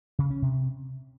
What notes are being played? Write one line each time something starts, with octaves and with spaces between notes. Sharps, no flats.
C#3
C#4
C3